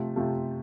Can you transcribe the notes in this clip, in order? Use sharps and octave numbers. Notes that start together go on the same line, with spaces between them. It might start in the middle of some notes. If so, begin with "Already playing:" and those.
Already playing: C3 F3 A3
C3 F3 A3